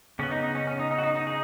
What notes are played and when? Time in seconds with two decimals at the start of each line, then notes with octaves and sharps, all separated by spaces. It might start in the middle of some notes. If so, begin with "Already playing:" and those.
0.19 C#3 C#4
0.23 B3
0.31 D#4
0.43 D#4
0.55 C#4
0.67 C#4
0.79 D#4
0.91 D#4
0.98 F#4
1.03 D#4
1.15 D#4
1.27 D#4 G#4